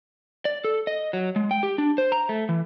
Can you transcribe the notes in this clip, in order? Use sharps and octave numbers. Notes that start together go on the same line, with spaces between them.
D5
A4
D#5
F#3
G#3
G5
G4
D4
C5
A#5
A3
E3